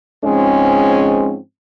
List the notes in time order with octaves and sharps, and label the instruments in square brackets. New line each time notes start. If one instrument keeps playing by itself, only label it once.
[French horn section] G#2 F3 G#3 C4 C#4